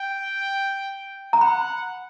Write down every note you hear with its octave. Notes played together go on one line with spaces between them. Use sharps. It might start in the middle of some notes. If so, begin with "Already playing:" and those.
Already playing: G5
A#5
F#5 B5